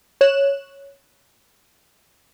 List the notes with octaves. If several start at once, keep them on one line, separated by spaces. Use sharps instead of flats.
C#5 F#6 E7